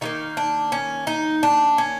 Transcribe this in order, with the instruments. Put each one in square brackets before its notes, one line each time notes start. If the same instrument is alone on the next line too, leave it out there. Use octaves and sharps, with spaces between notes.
[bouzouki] D#3 G3 A#3 D#4
D4
C#4
D#4
D4
C#4